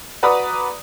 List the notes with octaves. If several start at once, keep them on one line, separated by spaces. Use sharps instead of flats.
F#4 B4 D5 A#5 B5 D#6